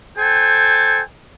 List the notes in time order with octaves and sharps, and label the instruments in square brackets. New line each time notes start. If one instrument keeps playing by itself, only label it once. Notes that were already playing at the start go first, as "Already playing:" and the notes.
[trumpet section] A4 C5 G5 G#5